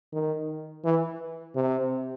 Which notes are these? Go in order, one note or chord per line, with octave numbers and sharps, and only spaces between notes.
D#3
E3
C3